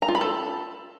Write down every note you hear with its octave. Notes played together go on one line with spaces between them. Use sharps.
A#5
F4
B5
A4